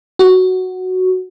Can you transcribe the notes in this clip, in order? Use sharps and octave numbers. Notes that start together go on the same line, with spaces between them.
F#4